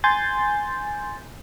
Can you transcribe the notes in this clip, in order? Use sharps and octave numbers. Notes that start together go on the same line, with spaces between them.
G#5 C6 G6 A6